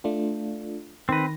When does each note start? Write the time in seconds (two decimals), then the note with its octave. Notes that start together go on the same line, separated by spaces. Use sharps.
0.04 A3 D4 F4
1.09 D#3 C4 B4 A#6